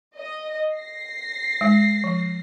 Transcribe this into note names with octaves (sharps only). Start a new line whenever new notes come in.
D#5
A#6 C7
G#3
F3